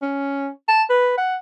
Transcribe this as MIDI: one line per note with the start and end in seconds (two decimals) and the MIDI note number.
0.02 0.49 61
0.68 0.83 81
0.89 1.15 71
1.18 1.35 78